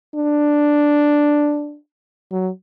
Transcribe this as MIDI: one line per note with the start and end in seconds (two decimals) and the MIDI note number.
0.15 1.76 62
2.32 2.49 54